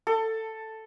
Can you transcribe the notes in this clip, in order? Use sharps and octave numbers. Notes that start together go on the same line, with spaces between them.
A4